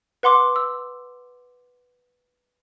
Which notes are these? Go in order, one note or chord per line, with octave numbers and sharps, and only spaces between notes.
B4 F#5 C6 D6
E6